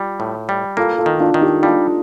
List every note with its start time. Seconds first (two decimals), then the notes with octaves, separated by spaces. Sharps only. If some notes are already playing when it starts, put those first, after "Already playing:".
Already playing: G3 F4
0.20 A2
0.49 G3
0.77 A#3 F4 A4
0.98 F4 A4
1.06 D#3
1.20 D4 F4
1.34 D#3
1.41 D#4 G4
1.63 G3 D4 F4